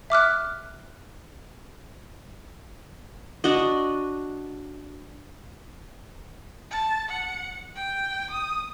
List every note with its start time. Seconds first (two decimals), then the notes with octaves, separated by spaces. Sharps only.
0.10 E5 D6 F6 F#6
3.44 D4 F#4 D#5
6.71 A5
7.09 F#5
7.76 G5
8.30 D#6